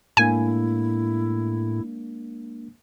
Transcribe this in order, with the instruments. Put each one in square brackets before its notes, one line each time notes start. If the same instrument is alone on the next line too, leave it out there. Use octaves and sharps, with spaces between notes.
[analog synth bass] A2 [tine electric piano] G#3 A#3 D4 [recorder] E4 [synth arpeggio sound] G#5